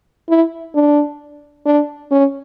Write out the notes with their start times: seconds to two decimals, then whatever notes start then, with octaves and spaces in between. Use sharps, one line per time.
0.29 E4
0.75 D4
1.66 D4
2.11 C#4